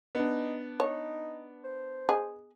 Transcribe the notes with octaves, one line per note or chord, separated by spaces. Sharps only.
B3 D4 D#4
D#4 C#5
C5
G#4 D#5